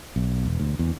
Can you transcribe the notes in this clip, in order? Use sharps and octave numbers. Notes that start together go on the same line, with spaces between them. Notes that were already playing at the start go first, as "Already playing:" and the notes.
B1
E1
D2
E2